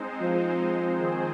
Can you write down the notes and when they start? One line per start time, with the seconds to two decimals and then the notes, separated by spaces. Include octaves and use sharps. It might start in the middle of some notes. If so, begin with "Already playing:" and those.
Already playing: G#3 C4 D#4 C5
0.21 F3
0.97 D#3 C4 G#4 C5